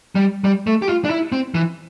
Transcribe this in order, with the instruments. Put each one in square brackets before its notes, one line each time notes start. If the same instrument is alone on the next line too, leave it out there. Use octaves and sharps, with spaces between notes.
[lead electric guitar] G3
G3
A3
G4
F4
D4
E4
C4
E3